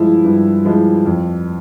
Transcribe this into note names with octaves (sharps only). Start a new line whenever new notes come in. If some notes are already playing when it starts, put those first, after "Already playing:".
Already playing: G2 F3 G#3 E4
G2
F3 G#3 E4
F2